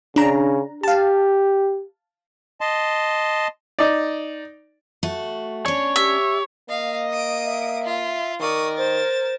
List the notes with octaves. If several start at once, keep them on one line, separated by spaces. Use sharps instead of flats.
C#3 D4 A#5
G4 F5 A5
D#5 A5 C6
D#4 D5
A3 F#4
C#4 D4 C#5
G4 E5
A#3 D#5 F5
D#6 D7
E5
F4
D#3 A#4 D5 C#6 D#6
C5 A6 E7